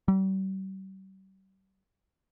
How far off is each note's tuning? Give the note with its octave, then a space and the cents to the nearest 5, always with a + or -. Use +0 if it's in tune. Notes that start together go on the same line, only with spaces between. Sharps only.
G3 -40